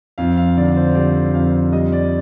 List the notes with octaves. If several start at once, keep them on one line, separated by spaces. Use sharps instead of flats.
F2 F5
F5
D3 D5
C5
G3 D5
F2 F5
G3 D#5
D5